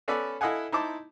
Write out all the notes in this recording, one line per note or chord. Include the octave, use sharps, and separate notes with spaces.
B3 C#4 A4 B4 D5
E4 A4 D#5 F5 F#5 G#5
D#4 E4 C5 A5 D6